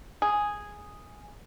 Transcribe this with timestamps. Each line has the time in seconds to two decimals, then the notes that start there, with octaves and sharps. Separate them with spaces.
0.22 G#4